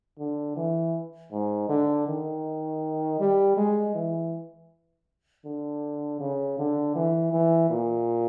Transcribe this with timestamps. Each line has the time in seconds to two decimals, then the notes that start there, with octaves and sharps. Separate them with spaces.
0.19 D3
0.57 E3
1.32 G#2
1.69 D3
2.08 D#3
3.20 G3
3.57 G#3
3.95 E3
5.45 D3
6.20 C#3
6.58 D3
6.95 E3
7.33 E3
7.70 A#2